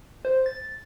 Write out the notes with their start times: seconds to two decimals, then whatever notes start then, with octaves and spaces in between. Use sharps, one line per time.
0.25 C5
0.46 A6